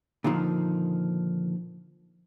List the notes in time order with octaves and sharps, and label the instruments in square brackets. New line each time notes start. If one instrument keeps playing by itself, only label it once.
[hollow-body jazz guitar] A#2 D3 D#3 F3